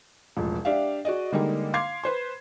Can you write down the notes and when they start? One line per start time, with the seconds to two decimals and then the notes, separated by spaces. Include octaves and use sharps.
0.37 E1 A1 F3
0.65 D4 G4 D5 E5 F5
1.05 F#4 G#4 D5 D#5
1.32 D3 G3 G#3 A#3 D#4
1.74 F5 C6 D6 G#6 C7
2.04 B4 C5 C6